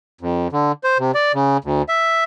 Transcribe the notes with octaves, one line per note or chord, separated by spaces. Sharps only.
F2
D3
C5
C3
D5
C#3
D2
E5